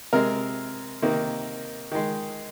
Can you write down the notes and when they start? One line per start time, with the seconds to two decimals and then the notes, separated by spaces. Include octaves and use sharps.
0.13 C3 G#3 A#4
1.02 C3 D#3 A#3
1.92 D#3 G#3